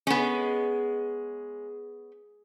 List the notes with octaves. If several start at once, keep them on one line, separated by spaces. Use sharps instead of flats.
G#3 B3 C#4